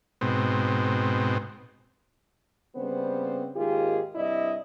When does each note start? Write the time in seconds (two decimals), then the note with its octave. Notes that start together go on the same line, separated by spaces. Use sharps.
0.21 G#2 B2 C4
2.76 C#3 G3 B3 C4 C5
3.56 D#2 G#2 D#3 F4 G4 G#4
4.15 G2 C3 E4 D5 D#5